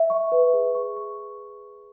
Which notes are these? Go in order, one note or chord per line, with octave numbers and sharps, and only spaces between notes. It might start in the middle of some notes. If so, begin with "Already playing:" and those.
Already playing: E5
C#6
B4
G#4
C#6
C#6